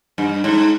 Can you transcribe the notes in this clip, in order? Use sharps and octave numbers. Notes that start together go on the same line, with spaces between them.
G2
G#2